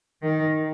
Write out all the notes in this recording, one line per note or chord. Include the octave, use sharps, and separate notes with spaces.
D#3